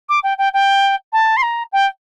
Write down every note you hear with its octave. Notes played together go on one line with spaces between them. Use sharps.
D6
G5
G5
G5
A5
C6
A#5
G5